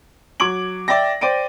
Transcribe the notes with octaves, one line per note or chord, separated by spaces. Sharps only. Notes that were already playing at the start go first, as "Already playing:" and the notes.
F#3 D6 G#6 D7 F#7
D5 E5 G5 A#6
C5 D5 G5 D7 D#7